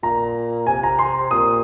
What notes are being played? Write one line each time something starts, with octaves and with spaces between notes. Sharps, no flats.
A#2 A#5
C3 G#5
A#5
C6
A#2 D#6